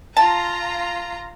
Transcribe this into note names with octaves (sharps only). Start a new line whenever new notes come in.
F4 A5 A#5